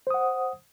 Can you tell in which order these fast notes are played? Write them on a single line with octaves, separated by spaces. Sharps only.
C5 D#6 F#5